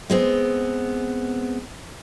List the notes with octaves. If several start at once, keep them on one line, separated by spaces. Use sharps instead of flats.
G#3 B3 C4